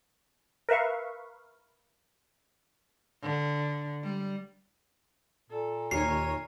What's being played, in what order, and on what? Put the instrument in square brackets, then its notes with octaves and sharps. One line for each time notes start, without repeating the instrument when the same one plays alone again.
[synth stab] A#4 B4 E5 F5 C#6
[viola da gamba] D3
G3
[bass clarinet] A#2 [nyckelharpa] A4
[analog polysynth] D#2 C#5 D#7 [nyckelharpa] A#4 [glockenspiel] C7